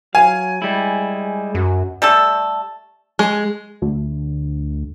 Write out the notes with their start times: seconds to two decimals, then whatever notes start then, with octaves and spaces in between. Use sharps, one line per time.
0.15 F#3 F5 G#5
0.62 G3 G#3 E4
1.55 F#2 F#4
2.02 G3 A3 A4
3.19 G#3
3.82 D2